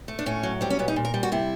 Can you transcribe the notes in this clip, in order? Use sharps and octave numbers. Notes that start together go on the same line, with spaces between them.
A3
D4
A2 C#4
F#3
G3 C4
C#4
A#2 B3
D#4
A#2
A#4
G3
F#4
C3 E4